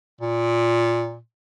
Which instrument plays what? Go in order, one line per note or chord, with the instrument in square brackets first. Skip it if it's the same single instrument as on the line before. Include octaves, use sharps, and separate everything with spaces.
[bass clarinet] A#2